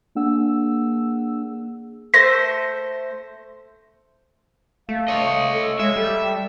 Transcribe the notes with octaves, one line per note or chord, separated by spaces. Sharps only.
A#3 D4 G#4 F#5 E6
A3 C5 A#6
A3 F5
C#5 D#5
A4
G#3 E5
G3 A4